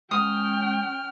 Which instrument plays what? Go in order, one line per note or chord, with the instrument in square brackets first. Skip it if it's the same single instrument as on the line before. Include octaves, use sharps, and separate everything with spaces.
[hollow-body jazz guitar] G#2 F#5 [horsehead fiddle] C#4 G5 [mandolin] D#6 [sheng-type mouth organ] F6